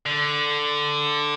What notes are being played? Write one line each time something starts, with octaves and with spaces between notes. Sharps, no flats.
D3